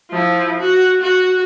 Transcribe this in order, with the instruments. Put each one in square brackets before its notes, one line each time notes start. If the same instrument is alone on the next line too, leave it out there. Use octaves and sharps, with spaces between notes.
[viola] F3 E4
F#4
F#4